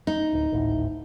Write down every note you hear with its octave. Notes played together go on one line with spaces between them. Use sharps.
D#4
D1
G#1 D2 A2